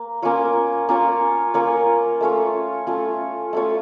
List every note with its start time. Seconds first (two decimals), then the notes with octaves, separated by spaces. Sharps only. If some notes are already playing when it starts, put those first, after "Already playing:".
Already playing: A#3
0.22 A#3 C#4 F4 C#5
0.89 A#3 C#4 F4 C#5
1.54 A#3 C#4 F4 C#5
2.21 A3 C#4 F4 C#5
2.87 A3 C#4 F4 C#5
3.53 A3 C#4 F4 C#5